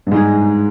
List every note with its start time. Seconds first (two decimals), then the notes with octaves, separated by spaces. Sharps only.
0.07 G2
0.11 G#2 G#3 D#4 G#4